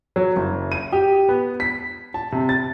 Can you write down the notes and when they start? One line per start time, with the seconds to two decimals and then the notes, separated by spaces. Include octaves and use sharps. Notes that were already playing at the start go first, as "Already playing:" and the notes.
0.16 F#3
0.36 F#1
0.72 D#7
0.92 G4
1.29 B3
1.60 B6
2.14 A5
2.32 C3
2.49 A6